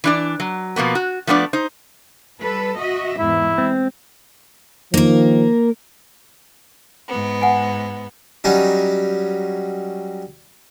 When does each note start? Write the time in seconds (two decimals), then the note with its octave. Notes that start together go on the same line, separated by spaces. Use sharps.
0.04 E3 D4 D5
0.40 F#3
0.76 B2 F3 A#3 B3
0.95 F#4
1.27 F3 A3 B3 D4 D5
1.53 D#4 C5
2.40 G3 A4 B4
2.77 F#4 D#5 E5
3.19 E2 G#2 E4
3.58 G#3 C4
4.94 D#3 F3 A#3 A#4
7.08 G#2 B3
7.41 F#5 G#5
8.44 F#3 G3 C#4 D#4